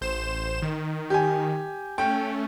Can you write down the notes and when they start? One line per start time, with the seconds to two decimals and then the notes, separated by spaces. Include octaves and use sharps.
0.01 A1 C5 E7
0.62 D#3
1.10 G4 G#5
1.98 A3 C#4 G5